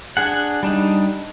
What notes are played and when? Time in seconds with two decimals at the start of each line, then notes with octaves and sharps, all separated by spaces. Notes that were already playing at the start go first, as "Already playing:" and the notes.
0.17 D4 G#4 F#5
0.63 G3 D4 D#4